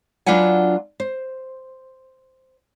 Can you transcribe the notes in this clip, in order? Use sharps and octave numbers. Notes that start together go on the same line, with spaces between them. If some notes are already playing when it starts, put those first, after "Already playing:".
F#3 D4 F4 B4 F#5 G#5
C5